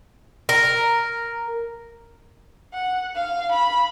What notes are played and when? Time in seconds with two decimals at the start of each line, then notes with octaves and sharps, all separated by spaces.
0.49 A#4
2.74 F#5
3.15 F5
3.52 B5